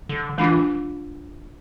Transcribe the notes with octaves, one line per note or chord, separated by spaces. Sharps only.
D3
E3 G#3 D4 F4